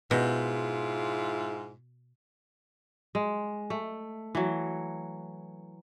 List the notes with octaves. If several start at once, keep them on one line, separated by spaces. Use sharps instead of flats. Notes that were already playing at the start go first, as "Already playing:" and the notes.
G#2 B2 E4 F4
G#3
A3
E3 F#3